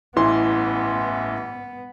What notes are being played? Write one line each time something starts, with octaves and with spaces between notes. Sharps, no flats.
A1 E3 B3 C6